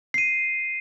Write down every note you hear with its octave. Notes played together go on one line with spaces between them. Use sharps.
C7 D#7